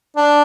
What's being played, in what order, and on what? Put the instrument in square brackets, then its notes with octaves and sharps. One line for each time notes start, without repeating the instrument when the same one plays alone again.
[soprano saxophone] D4